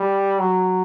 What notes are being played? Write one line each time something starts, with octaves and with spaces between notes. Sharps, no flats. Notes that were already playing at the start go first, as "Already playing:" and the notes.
Already playing: G3
F#3